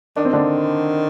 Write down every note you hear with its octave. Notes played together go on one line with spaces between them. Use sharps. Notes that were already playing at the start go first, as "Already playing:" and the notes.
D#3 D4
C4
D3 D4